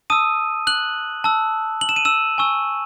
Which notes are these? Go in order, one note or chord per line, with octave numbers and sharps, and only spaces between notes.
A5 D#6 E6 D#7
F#6 F#7
A5 E6
F#7
E7
D#7
E6 E7
G#5 C#6 E6